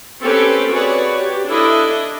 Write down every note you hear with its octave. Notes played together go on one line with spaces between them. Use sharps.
C4 C#4 G4 A4 B4 C#5
F#4 G#4 B4 C#5 D5
G4
D4 E4 A4 D#5